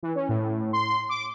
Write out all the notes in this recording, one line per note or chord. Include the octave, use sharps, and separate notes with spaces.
E3
C#4
A2
C6
D6